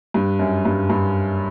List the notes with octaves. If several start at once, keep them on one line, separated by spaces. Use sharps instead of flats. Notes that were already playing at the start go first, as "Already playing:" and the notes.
G2
F#2
G2
G2